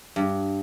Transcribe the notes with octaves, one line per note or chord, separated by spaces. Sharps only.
G2